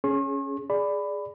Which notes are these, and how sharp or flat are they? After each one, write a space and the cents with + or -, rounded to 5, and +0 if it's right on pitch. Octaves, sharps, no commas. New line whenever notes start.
C#4 +0 G#4 +10 C#6 -45
G#4 +0 D5 +0 B5 +15